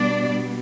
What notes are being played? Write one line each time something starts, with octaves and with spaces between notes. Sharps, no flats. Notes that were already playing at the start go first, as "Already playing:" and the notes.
Already playing: B2 G3 B3 D4 D5